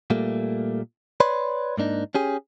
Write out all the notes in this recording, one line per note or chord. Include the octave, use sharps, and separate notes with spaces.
A#2 G3 A3 A#3
B4 C#5 D5 B5 C6
G#2 A#3 D4 D#4
C#4 G4 G#4